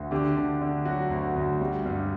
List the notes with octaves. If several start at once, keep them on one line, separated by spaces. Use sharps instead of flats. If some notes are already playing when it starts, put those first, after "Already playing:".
Already playing: D2
D3 G4
D3
D3
F#3 F#4
D2
D2
G3
G2